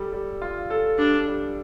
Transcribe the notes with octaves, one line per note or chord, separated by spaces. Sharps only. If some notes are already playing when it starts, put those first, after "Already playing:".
Already playing: G3 A4
G3
F4
A4
G3 D4
G3